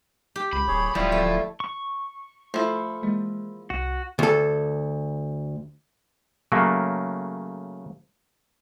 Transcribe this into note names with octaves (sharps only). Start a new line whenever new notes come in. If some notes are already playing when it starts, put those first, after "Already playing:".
G4
C#2 B5
D1 G#4 C#5
D1 F3 G3 E4
A3
C#6
F3 A3 E4 A4
E3 G#3 A#3
C2 F#4
D2 A4
C#3 F#3 A3 A#3